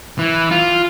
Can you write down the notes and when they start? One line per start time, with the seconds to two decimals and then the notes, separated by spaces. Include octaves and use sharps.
0.19 E3
0.51 F4